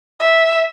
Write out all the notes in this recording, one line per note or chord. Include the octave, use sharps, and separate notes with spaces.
E5